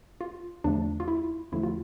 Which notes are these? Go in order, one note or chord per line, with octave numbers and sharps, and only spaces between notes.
F4
E2 D3 F3 A3 D4
F4
E4
E2 D3 F3 A3 E4
F4